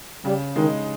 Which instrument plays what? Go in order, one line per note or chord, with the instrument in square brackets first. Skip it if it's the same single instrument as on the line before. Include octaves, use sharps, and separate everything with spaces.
[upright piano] C#3 [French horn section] G3
[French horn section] D#3 [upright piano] G#3 D#4